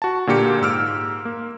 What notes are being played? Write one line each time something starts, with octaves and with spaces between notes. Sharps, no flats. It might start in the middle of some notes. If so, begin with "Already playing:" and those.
F#4 A5
A#2 D3 A#3 G4 C#7
G#2 E6 F6 D7
A#3